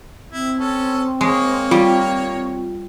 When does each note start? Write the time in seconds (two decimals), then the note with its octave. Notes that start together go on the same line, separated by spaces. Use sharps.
0.32 C4 E4
0.59 C#4 A4
1.21 D#3 G#3 A#3 C#5
1.71 G3 F4